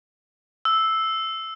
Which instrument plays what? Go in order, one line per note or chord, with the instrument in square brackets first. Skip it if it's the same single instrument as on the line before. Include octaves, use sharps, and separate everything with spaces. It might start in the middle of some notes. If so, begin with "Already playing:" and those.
[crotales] E6